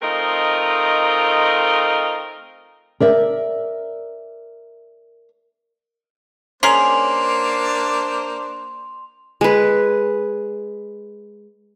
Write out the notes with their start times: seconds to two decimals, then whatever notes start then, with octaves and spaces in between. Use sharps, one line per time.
0.02 A3 C4 D#4 F4 A#4 D#5
3.00 A#4 D5 E5
6.63 A#3 C#4 D4 G#4 A#4 C5 C6 F7
9.41 G#3 B4